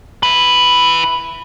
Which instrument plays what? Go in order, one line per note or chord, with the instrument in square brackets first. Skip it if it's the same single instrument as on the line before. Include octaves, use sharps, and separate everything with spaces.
[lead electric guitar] E4 B4